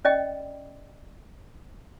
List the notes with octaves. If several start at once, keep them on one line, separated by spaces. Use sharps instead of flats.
C#4 D5 D#5 G5